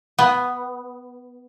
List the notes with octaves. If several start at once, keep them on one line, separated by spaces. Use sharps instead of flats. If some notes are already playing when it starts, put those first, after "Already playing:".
B3